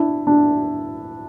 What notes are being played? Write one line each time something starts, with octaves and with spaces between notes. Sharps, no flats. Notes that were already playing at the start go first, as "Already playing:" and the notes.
Already playing: D4 E4
D4